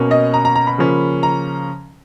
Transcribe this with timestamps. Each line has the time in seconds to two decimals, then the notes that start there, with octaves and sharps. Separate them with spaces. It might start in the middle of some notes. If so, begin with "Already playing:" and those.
Already playing: B2 A#3 C#4
0.11 D#5
0.34 A#5
0.45 A#5
0.55 A#5
0.67 B5
0.78 C#3 F3 A#3 C#4
1.23 A#5